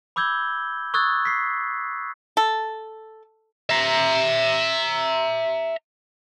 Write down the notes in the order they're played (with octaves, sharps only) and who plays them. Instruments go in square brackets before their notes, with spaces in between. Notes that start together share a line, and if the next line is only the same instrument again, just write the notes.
[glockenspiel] B5 D6 E6 G6 G#6 G7
C#6 D#6 E6 F#6 G#6 A6
B6 C7
[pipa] A4
[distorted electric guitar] E5 A#5